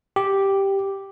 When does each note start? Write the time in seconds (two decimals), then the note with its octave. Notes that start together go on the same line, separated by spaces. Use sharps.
0.16 G4